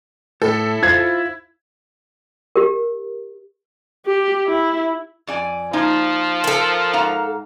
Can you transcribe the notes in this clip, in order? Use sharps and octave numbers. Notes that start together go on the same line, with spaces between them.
A2 E4 A4
F4 C5 G#6
G4 A#4
G4
E4
F2 D5 G#5
F3 A#3 D#4
A4 A#4
G#2 F5 A#5